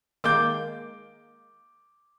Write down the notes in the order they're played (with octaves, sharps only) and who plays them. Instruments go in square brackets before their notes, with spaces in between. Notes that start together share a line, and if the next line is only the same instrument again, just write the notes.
[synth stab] D#3 G#3 A#3 [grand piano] D6 G6